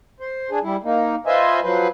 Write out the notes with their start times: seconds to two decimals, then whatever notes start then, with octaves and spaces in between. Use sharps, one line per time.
0.20 C5
0.51 D4 G#4
0.63 G3 E4
0.84 A#3 D#4
1.27 F4 B4 C5 D#5 E5 G#5
1.63 F3 F#3 B4 C5